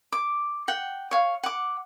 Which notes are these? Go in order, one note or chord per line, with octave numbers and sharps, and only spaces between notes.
D6
F#5 G5
C#5 F5
F#5 D6